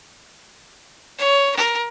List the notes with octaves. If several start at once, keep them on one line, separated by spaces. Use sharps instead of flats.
C#5
A#4